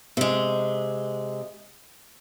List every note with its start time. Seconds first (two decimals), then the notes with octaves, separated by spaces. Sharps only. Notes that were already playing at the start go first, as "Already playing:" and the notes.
0.17 C3 G#3